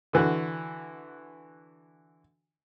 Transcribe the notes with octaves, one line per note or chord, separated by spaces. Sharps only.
D3 E3 F#4